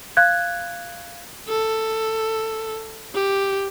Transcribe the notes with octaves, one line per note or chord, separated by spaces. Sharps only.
F5 F#6 G#6
A4
G4